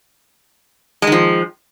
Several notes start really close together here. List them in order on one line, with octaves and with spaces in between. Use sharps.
G#3 D#3 F3